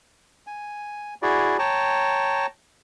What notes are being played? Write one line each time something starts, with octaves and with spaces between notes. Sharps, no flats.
G#5
E4 F#4 G#4 D5
C#5 G5 A5 A#5